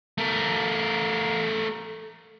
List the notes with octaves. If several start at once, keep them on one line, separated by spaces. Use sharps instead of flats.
A3 A#4